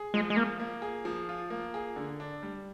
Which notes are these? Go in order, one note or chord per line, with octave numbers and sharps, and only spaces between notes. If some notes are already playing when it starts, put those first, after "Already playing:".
Already playing: G#4
F3 G#3
G#3
A#3 F4
A#3
G#4
F3
F4
A#3
G#4
D3
D4
G3